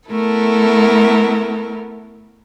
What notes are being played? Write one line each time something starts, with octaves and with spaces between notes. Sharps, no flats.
A3 B3 E4 A4 A#4